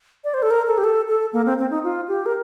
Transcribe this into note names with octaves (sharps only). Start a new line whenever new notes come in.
D5
C5
A4
A#4
A4
G4
A4
A4
A#3
C4
C4
D#4
F4
G4
A#4